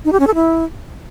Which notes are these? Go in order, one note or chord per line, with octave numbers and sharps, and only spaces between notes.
D#4
G4
C#4
A4
E4